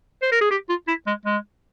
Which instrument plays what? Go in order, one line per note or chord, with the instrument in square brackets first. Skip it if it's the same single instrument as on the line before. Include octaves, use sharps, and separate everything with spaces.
[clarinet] C5
A#4
G#4
G4
F4
E4
G#3
G#3